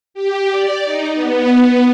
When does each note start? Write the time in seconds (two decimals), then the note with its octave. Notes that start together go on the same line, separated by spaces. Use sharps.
0.14 G4
0.52 D5
0.85 D#4
1.15 B3